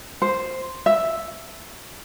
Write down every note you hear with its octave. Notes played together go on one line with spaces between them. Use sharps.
C5
E5